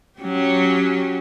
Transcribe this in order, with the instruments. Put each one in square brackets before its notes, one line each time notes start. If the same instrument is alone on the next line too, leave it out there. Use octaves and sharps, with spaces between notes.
[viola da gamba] F#3 C#4 G4